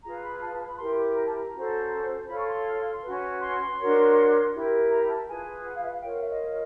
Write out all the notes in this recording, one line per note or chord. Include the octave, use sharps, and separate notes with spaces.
F4 G#4 B4 A#5
B5
A5
A5
B5
E4 G4 A#4 C6
D6
A#5
A5
A#5
C#4 F#4 A4 C5
F4 A4 C#5 B5
C#6
C6
C#4 F#4 B4
C6
D4 F#4 A#4 C#5
E4 G4 A#4
A#5
A5
F4 G#4 B4 G#5
F#5
F5
E5
F#5
F5
F4 A#4 C#5 G5
F#5
E5
D#5